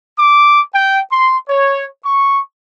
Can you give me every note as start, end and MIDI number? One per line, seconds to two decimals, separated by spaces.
0.18 0.61 86
0.74 1.00 79
1.11 1.36 84
1.48 1.87 73
2.05 2.41 85